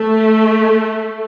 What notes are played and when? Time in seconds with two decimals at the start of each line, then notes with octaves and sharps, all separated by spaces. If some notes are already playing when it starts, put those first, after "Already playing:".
Already playing: A3